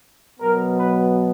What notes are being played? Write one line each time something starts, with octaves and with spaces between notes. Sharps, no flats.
B2 F#3 B3 A#4
B4